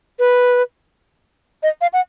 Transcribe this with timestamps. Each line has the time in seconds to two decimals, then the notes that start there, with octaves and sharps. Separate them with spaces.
0.19 B4
1.63 D#5
1.81 F5
1.93 F#5